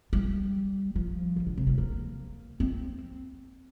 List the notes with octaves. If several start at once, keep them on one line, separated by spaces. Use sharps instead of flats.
G3
F3
D#3
D3
C3
G3
A#3
C4